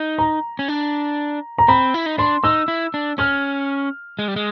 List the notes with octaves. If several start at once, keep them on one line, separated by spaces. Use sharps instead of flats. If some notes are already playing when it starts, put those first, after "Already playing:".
Already playing: D#4
A#5
C#4
D4
A#5
C4 B5
E4
D#4
D4 C6
D#4 E6
E4
D4
C#4 F6
G#3
G3
G#3